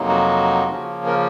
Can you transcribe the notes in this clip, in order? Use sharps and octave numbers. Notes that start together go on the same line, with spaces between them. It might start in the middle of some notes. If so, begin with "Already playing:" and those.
Already playing: F2 C3 F#3 A#3 D#4
F#4
C#3 F3 A#3 C#4
A#4